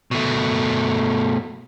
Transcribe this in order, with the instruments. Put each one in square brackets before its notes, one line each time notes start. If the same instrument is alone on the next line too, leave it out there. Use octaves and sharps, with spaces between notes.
[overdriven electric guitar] B2 A3